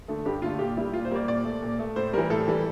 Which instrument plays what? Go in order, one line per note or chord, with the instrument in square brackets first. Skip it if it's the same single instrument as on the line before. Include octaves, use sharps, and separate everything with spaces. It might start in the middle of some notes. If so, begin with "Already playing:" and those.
[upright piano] D3 A3
G2 G4
D3 A3 F4
A#2 G4
G3 A#3 E4
A#2 F4
C5
G3 A#3 D5
A#2 D5
A3
A#2
A3
A2 C5
E3 G3 A#4
A2 A4
E3 G3